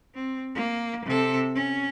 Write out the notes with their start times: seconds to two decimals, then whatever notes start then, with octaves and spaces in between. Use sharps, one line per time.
0.15 C4
0.55 A#3
1.06 C3 A4
1.55 C#4